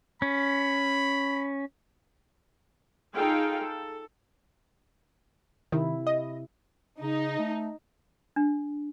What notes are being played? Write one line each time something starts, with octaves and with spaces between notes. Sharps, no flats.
C#4 B5
D#4 F4 G#4 A4 F5 G5
A4
C3 D#3 E4
D#5
C#3 D#4
A3
D4